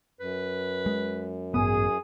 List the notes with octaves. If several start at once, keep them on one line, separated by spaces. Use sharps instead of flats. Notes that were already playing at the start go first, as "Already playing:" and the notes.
F#2 B4
G#3
A1 G2 B3 G#4 D#6